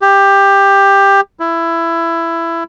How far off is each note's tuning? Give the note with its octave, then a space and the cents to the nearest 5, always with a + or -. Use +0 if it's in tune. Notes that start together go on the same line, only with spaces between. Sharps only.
G4 +15
E4 +15